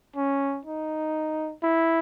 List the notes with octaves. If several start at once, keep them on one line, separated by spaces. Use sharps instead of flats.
C#4
D#4
E4